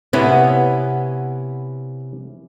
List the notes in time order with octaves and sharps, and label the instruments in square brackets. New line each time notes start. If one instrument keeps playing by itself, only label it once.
[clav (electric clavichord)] C3 C#4 E4 [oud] B3